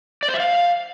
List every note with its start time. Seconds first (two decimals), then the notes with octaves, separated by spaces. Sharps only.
0.23 D5
0.28 C5
0.34 E5
0.40 F5